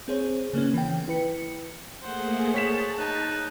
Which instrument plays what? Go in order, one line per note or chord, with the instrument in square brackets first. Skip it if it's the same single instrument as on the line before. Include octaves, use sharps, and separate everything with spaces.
[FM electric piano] C4 G#4 C5 C#5
C#3 A#3 B3 C#4
E3 G5
E4 B4 C#7
[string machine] A3 A#3 G#4 [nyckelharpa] C5 F#5
[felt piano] G#4 B6 E7 [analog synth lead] C#5 [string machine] A5
[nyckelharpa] D#4 [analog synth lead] F#6